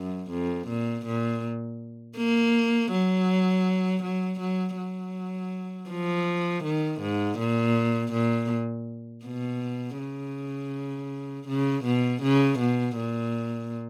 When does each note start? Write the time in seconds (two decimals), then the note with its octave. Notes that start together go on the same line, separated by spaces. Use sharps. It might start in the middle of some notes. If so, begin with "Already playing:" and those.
Already playing: F#2
0.31 F2
0.68 A#2
1.06 A#2
2.17 A#3
2.91 F#3
4.03 F#3
4.40 F#3
4.77 F#3
5.90 F3
6.64 D#3
7.01 G#2
7.39 A#2
8.12 A#2
9.25 B2
9.98 C#3
11.48 C#3
11.84 B2
12.22 C#3
12.59 B2
12.96 A#2